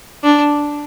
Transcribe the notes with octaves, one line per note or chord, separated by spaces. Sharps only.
D4